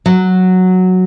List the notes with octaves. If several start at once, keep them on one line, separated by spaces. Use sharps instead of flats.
F#3